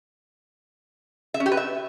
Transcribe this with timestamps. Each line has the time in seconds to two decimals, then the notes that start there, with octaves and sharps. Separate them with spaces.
1.34 E5
1.40 C#4
1.46 G4
1.51 B4
1.57 E5